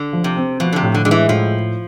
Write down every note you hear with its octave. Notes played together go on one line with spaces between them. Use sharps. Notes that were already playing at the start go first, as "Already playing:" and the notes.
Already playing: D3
F3
C3
C4
B2 F3
D3
C3
A2
D3
D3 G#3
E3
A2 F3